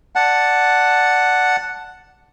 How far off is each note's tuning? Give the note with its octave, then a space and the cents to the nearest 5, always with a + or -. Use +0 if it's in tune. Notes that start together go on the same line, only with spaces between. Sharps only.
D5 +0 F#5 +0 A5 +0